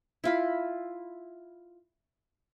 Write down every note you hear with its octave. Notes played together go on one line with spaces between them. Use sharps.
E4 F4 B5